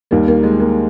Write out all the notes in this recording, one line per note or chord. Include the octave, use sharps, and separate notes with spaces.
D#2 D#3 G3 A#3
A#3
G#3
A#3